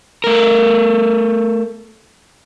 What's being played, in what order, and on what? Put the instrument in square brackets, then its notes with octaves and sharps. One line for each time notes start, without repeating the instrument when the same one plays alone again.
[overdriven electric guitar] A3 A#4